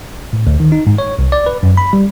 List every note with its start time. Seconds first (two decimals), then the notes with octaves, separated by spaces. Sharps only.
0.33 A2
0.47 D2
0.60 D#3
0.72 D#4
0.87 G#2
0.98 C#5
1.19 C2
1.32 D5
1.47 B4
1.63 F#2
1.77 B5
1.93 G3